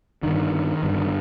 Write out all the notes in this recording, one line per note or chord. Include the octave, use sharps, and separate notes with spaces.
G2 D3 D#3
G2 D3